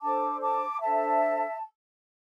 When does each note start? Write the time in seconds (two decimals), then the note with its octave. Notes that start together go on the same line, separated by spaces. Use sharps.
0.01 D4 A4 C5 A5 D6
0.41 A5 D6
0.80 D4 A4 C5 E5 A5